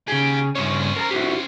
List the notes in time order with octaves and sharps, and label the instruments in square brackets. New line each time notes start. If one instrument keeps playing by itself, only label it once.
[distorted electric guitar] D#2 G4 [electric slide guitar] C#3 G#4
[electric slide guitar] G2 C#3 C#5 [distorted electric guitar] C#4 C5
[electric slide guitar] A#4 A5 A#5
E4 F#4 G4